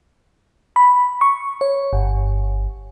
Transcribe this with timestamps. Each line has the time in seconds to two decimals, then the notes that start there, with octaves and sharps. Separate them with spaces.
0.76 B5
1.21 C#6
1.61 C#5
1.93 G1